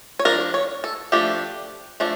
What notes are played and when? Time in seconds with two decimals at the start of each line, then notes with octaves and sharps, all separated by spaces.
0.19 C#5
0.25 F3 A3 D4 A#4
0.54 C#5
0.84 A4
1.12 F3 A3 D4 G4
2.00 F3 A3 D4